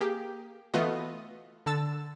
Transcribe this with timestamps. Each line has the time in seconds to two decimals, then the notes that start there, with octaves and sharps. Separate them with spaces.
0.01 A#3 G4 G#4
0.74 E3 A3 B3 F4 F#4 D#5
1.66 D3 A5 E6 A6